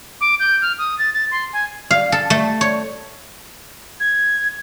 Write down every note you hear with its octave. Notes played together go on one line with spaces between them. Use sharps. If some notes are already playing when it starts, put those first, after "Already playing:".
D6
G6
F6
D#6
A6
A6
C6
G#5
F5
A4
A3
C#5
G#6